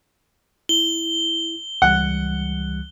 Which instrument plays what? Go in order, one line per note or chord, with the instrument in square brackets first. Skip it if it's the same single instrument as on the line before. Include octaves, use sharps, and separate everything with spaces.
[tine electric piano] E4 [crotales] G7
[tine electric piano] C#2 E3 G3 [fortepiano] F#5